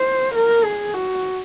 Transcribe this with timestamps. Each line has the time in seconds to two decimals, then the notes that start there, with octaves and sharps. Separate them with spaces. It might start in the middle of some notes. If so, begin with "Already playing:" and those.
Already playing: C5
0.35 A#4
0.64 G#4
0.94 F#4